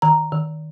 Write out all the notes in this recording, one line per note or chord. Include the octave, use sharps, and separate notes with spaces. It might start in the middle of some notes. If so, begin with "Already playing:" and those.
D#3 A#5
D#3